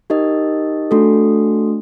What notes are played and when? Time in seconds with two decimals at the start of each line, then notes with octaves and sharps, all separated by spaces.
0.10 D#4 G4 A#4 D#5
0.91 A3 D4 F#4 A4